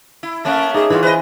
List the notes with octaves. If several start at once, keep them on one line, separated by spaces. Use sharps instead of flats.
E4
A3 A#3 C#4 E5 A5 F#6
D#4 G#4 E5 D6
E3 D#4 F4 F#4
B4 C5 D#5 E5 G#5